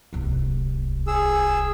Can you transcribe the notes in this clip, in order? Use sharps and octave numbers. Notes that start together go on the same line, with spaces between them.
D1 C2
G#4 E6